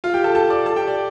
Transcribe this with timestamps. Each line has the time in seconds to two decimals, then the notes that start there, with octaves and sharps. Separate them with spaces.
0.04 F4 F5
0.14 G4 G5
0.24 A4 A5
0.35 A4 A5
0.50 D5 D6
0.66 A4 A5
0.76 G4 G5
0.87 D5